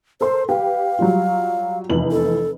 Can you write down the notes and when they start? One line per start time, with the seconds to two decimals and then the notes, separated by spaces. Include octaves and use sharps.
0.21 A4 A#4 C5 C6
0.49 G4 B4 F5 G5
0.99 F#3 G3 F4
1.89 F1 E2 F#7
2.11 A4